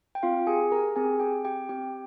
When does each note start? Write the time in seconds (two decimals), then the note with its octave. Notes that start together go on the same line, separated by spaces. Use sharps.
0.15 G5
0.23 C4 F4 F5
0.47 G4 G#4 G#5
0.71 G4 A#4 A#5
0.96 C4 G#4 G#5
1.20 C4 G4 G5
1.45 G4 G5
1.69 C4 G4 G5